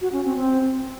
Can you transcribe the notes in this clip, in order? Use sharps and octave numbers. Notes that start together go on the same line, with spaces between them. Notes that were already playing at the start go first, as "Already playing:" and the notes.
F#4
C#4
C4
C4